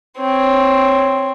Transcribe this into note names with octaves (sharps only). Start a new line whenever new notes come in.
C4 C#5